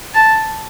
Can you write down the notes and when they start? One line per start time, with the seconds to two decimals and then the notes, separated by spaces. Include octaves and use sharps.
0.14 A5